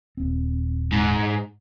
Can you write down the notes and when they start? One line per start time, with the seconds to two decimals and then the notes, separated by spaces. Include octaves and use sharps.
0.17 D#1 C4
0.92 G#2